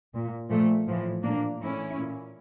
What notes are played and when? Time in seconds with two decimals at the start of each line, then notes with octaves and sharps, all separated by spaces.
0.13 A#2
0.50 A#2 F3 A3
0.86 A2 E3 F3
1.23 A#2 A#3 D4
1.61 A2 E3 C#4 E4
1.97 A#2